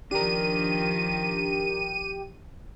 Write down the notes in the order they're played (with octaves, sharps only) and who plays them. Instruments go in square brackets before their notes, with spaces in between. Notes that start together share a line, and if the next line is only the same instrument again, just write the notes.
[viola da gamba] D#3 F3 [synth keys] D4 A#4 [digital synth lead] G4 [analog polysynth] D#7